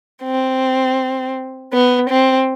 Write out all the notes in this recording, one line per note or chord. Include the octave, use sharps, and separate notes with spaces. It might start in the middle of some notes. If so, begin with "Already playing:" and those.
C4
B3
C4